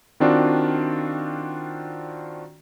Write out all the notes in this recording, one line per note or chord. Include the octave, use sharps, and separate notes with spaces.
D#3 C4 D4 F4 F#4 D5